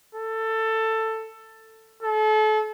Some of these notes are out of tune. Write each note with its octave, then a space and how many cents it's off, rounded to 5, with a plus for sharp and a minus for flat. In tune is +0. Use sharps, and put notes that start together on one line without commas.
A4 +15
A4 -35